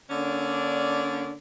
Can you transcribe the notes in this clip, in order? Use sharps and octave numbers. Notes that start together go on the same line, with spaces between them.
D3 A#3 C#4 D4